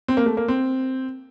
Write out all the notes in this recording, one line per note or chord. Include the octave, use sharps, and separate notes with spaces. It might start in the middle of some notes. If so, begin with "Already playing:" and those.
C4
A#3
A3
A#3
C4